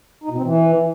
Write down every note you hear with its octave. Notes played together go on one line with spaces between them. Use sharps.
D#4
B2
C4
E3